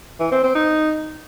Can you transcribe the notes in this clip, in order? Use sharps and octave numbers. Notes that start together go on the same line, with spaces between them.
E3
C4
C4
D#4